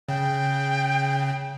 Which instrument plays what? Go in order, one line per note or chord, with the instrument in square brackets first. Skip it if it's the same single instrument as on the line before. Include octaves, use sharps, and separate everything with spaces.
[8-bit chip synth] C#3 [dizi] G5